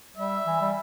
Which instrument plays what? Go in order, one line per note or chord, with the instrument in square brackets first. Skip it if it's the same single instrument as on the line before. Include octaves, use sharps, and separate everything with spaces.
[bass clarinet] G3 [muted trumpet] E5
[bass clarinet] E3
G3